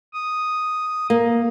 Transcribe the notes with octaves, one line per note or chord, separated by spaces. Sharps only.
D#6
A#3